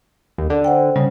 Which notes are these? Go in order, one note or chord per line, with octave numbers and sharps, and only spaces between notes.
D#2
D3 D5
C5 F#5 G5
C#3 G3